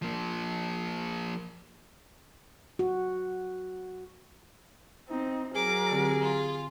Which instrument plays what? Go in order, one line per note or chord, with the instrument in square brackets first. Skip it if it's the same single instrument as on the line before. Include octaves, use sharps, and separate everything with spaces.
[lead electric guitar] F3 A#3
[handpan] F#4
[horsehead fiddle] C4 D#4
[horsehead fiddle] F#3 A#4 [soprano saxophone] G#4 [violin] D6
[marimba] D3 C4 G4
[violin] F4